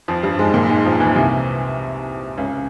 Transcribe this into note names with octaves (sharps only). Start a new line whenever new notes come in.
F2 F3
G2 G3
G#2 G#3
A#2 A#3
G#2 G#3
F2 F3
E2 E3
C2 C3
C#2 C#3